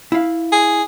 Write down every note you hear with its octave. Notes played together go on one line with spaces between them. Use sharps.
E4 F5
G#4